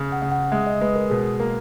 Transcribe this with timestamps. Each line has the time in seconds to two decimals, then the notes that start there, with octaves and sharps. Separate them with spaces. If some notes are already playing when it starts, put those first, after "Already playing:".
Already playing: C#3
0.12 F#5
0.22 C#3
0.32 F#5
0.52 G#3 E5
0.67 D#5
0.81 G#3 B4
0.96 A#4
1.10 B2 G#4
1.40 A#3 A#4